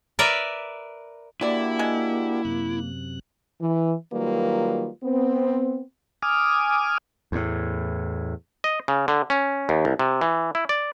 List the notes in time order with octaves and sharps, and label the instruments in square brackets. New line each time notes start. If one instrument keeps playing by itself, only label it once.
[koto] A#4 B4 D5 E5
[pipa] D3 D5 [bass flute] A#3 [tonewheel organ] D4 F#4 G4 [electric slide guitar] E4
[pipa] G#3
[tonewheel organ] F#2 C3 F#6
[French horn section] E3
D#3 F#3 G3 A#3 F4 B4
B3 C4
[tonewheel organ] G#5 D6 D#6 F6
[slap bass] E2 A2
[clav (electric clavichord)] D#5
C#3
D3
C#4
D#2
C2
C3
E3
E4
D5